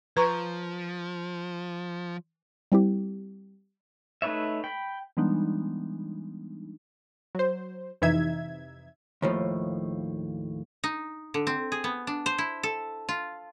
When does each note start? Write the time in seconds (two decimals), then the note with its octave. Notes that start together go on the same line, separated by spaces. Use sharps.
0.17 F3 B4 A#5 C#6
2.72 G3 C4 E4 G4
4.22 A3 D#4 B4 C#5 E5
4.64 G5 B5
5.17 E3 G3 G#3 B3 D4 D#4
7.35 F#3 C5
8.02 F2 C3 E3 D#4 E5 G#6
9.22 D#2 A2 F3
10.84 D#4
11.34 D3
11.47 C4
11.72 G#4
11.84 B3
12.07 D4
12.26 C5
12.38 E4
12.63 A4
13.09 F4